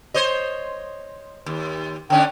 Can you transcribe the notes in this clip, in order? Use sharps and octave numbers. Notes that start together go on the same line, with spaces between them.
C5 C#5 D#5
D#2
D3 C#4 D4 G5